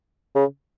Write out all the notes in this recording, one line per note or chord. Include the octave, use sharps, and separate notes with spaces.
C#3